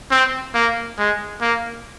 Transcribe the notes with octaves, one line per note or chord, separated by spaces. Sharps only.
C4
A#3
G#3
A#3